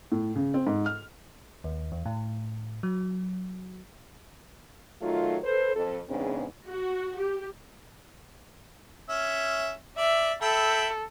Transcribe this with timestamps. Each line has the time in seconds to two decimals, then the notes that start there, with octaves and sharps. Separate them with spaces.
0.12 A2
0.36 C#3
0.54 C4
0.67 G#2
0.86 F6
1.64 D#2
1.92 E2
2.06 A2
2.83 F#3
5.02 D#3 F#3 A3 D#4 F4
5.44 A4 B4 C5
5.74 F2 A4
6.09 E2 G#2 C#3 B3 C4 D4
6.67 F#4
7.18 G4
9.09 C#4 E5
9.97 D5 E5
10.42 A4 E5 G5 B5